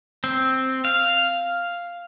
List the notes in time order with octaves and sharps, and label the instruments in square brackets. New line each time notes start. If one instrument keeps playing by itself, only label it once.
[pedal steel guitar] C4
F5